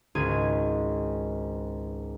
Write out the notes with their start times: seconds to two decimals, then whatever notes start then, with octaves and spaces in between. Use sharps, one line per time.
0.15 G#1 C#2 G#4 G#6 D#7